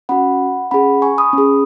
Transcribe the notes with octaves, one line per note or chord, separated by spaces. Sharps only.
C#4 F#4 F#5 B5
C#4 G#4 F#5 B5
G#5 C#6
B5 D#6
C#4 G#4